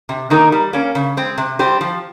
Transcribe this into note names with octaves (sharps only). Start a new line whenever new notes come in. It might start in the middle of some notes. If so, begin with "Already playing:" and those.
C3
D#3 A#3 D#4 A#4
G3
A#3 C#4
C#3
G#3 C4
C3
G3 C4 G4 C5
F3